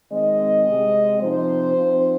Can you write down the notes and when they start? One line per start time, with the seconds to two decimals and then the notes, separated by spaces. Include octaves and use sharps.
0.11 D#3 G#3 C4 D#5
0.66 C3 G#3 C4
1.21 C3 F3 C4 D#4 C5
1.75 F3 C4 D#4